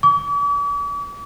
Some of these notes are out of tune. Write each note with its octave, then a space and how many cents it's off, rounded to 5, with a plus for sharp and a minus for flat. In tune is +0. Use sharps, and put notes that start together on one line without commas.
D6 -45